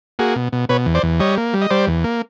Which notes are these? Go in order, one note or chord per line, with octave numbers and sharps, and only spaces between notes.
A#3 F#4 G#4
B2
B2
B2 B4 C#5
E2
C5 D5
E2
G3 C#5 D#5
A#3
G3
D#5
G3 C5 D5
E2
A#3